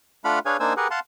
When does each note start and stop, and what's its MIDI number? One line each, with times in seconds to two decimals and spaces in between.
0.25 0.39 57
0.25 0.39 62
0.25 0.39 65
0.25 0.39 77
0.25 0.39 78
0.25 0.39 83
0.46 0.57 62
0.46 0.57 68
0.46 0.57 71
0.46 0.57 73
0.46 0.57 77
0.46 0.57 80
0.60 0.73 58
0.60 0.73 62
0.60 0.73 63
0.60 0.73 72
0.60 0.73 80
0.60 0.73 88
0.77 0.88 67
0.77 0.88 68
0.77 0.88 70
0.77 0.88 71
0.77 0.88 78
0.91 1.00 77
0.91 1.00 78
0.91 1.00 81
0.91 1.00 84